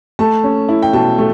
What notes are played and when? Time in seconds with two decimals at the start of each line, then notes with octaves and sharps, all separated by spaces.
0.19 A3 A5
0.44 C#4
0.69 E4
0.82 G5
0.93 B2 A5
1.18 A3